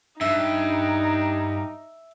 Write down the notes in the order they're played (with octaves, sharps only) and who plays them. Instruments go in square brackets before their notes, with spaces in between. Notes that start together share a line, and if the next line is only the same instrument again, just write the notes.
[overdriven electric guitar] G2 [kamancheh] D#4 [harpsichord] E5